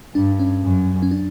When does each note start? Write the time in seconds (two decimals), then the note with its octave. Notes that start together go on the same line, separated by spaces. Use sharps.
0.15 G2 D4
0.39 C#4
0.63 F#2
1.02 C#4
1.11 D4